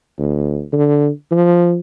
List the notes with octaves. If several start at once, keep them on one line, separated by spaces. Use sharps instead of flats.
D2
D3
F3